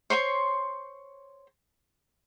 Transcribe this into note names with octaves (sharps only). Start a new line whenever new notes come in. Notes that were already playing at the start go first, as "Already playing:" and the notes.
C5 C#5 C6 C#6